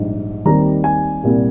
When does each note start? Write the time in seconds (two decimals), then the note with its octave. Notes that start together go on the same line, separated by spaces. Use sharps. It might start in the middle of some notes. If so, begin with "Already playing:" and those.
Already playing: A#1 G#2 G3
0.45 D#2 D#3 G3 C4 A#5
0.84 G#5
1.23 C2 A#2 G3